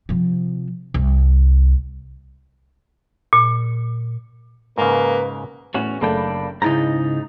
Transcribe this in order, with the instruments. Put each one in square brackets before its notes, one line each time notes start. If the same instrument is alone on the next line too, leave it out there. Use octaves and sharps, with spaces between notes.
[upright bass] C3 F3
C2
[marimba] A#2
[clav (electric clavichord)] G#2 C#3 [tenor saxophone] A#3 [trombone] B4
[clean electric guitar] E2 C#4 F#4 [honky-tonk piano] A2
[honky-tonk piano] F#1 A3 B5 [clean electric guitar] A#3 D4 G5
[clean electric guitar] G#2 D#4 [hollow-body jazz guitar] C#3 E4 A#5 [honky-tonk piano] G6 A6